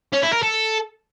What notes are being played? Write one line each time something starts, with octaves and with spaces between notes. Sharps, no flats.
C#4
E4
A#4
A4